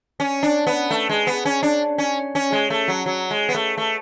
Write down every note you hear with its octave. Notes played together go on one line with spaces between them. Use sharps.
C#4
D4
B3
A3
G#3
B3
C#4
D4
C#4
C#4
G#3
A3
F#3
F#3
G#3
B3
A3
A3